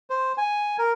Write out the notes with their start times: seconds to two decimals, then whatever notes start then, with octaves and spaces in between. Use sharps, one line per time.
0.10 C5
0.38 G#5
0.79 A#4